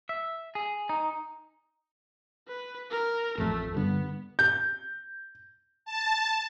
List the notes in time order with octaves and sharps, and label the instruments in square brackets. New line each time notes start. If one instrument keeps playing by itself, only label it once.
[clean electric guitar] E5
G#4
D#4
[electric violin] B4
A#4
[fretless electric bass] A1 F2 [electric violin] A3
[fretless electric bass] G2 D3 G3 [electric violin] B3
[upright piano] G6
[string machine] A5